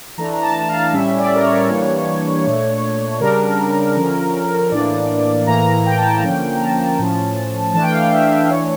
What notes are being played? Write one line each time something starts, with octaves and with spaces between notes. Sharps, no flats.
E3 A3 D4 A#5
A#5
A5
F5
A2 G3 C#4 E5
D5
A#4
C#5
E3 G3 A#3 D4
A#2 A3 D4
C#3 G3 D4 A#4
D3 F3 C#4
A2 E3 A#3 D4 D5
A2 E3 A#3 A#5
A#5
G5
A5
A5
D3 F3 A#3 C#4 G5
A#5
A5
A2 F3 C#4
E3 A3 D4 A5
G5
F5
G5
E5
E3 A3 D4 C#5